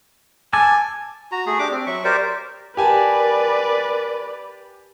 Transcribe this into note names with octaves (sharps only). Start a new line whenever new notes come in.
G#5 A5 D6 E6
F#4 A#5
A3 G#4
D4 G4 D6
C4
F#3 E5 C#6
G4 A#4 C5 D5
G4 A#4 B4 D5 G#5 A5